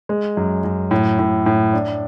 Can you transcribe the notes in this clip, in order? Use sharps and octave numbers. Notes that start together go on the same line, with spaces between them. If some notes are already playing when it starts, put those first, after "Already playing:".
G#3
F#2
F#2
A2
A2
A2
D4